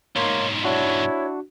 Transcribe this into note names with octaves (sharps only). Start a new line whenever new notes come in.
B1 G#2 A#3 C#5 C6
D4 E4 F#4 C#5